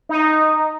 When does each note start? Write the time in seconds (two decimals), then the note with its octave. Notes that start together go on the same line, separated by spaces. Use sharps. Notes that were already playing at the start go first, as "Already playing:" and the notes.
0.09 D#4